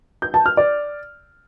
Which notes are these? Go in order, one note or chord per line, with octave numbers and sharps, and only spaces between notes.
G6
A5
F6
D5